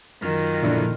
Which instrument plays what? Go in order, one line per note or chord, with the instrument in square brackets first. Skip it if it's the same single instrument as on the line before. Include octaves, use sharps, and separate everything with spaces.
[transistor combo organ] F#2 F4 [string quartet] D#3
[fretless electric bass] A#2 F3 [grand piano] D3 E4 D5